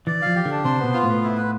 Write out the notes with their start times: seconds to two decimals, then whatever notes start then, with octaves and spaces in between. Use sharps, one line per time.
0.07 E3 D5
0.22 F3 F5
0.35 G4
0.45 D3
0.51 D4
0.64 C3 C5
0.79 B2 B3
0.94 F4
1.03 A2
1.09 B3
1.23 E4
1.37 B4